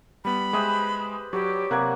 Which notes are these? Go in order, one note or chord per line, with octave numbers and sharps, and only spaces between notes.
G3 B3 B5
G#3 G4 B4 C5 E5 D#6
F#3 G4 C#5 D5
C3 A#3 A#4 F#5 F#6 G#6